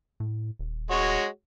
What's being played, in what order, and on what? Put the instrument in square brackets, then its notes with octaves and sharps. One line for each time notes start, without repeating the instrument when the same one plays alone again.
[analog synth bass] A2
D#1
[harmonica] G#3 F#4 C#5